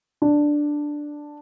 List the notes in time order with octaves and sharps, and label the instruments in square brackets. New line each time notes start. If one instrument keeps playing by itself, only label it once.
[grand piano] D4